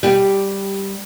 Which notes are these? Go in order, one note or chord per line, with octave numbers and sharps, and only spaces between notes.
G3 G4